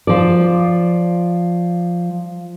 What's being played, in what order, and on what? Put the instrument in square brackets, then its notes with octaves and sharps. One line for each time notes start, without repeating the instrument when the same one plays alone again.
[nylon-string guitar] F3 D5